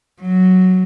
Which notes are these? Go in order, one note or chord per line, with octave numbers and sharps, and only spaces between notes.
F#3